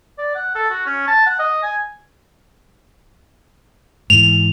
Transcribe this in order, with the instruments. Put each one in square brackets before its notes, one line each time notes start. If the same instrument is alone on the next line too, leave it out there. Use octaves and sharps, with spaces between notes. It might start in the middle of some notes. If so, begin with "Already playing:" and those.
[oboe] D5
F#5
A4
F#4
C#4
A5
F#5
D#5
G#5
[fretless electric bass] G#2 E3 [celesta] F7